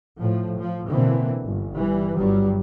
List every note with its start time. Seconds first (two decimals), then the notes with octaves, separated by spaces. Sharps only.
0.19 A2 F3
0.59 F3
0.89 B2 D3 E3 A#3 C4
1.42 G1
1.75 E3 G3
2.17 G1 G2 F#3 G3